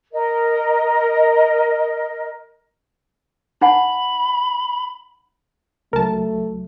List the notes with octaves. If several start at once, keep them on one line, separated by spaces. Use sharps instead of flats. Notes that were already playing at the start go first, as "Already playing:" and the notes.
A#4 D#5
D#4 F#5 G#5 B5
C#2 F#3 A3 A#4 A5